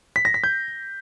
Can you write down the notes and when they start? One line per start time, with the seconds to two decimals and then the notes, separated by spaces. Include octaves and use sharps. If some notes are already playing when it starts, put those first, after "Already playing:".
0.16 B6
0.25 A#6
0.34 B6
0.44 G6